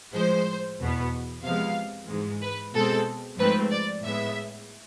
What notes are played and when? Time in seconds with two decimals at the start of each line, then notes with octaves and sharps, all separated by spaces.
0.14 A2 F3 G#3 C5
0.79 E2 B2 B3
1.44 C3 F3 G#3 B3 F5
2.09 G#2 E3 G#3
2.42 B4
2.74 B2 G#3 C4 A4
3.38 G#2 F3 A3 C4 B4
3.71 D5
4.03 A2 G#3 B3 E5